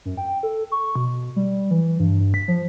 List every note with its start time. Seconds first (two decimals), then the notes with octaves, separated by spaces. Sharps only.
0.05 F#2
0.17 G5
0.43 A4
0.72 C#6
0.96 B2
1.36 G3
1.71 E3
2.00 G2
2.20 G2
2.34 B6
2.48 F3